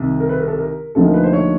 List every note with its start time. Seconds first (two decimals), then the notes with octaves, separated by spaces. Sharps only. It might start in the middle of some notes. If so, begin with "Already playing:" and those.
Already playing: C2 C3 D#3
0.20 A#4
0.29 B4
0.40 A#4
0.48 A4
0.58 A#4
0.95 D2 D3 F3 A#3 D#4 A4
1.05 A#4
1.14 B4
1.23 C5
1.33 C#5